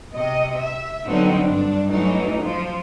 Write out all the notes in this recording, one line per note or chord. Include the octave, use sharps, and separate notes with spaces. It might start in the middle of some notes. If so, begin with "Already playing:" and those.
C3 D#5
E5
D3 F#3 G3 B3 C4 D#4
G2 D4
E3 F#3 A3 C#4 D#4
F3